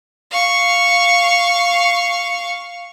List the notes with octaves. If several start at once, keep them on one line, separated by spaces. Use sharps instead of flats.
F5 C#6